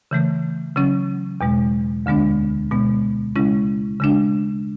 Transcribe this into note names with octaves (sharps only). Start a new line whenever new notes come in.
C#3 E3 A3
C#3 F#3 C#4
E2 B2 G#3
D2 D3 G#3 B3 D4
B2 G#3 B3
C#3 G#3 C#4 E4
C#3 G#3 D4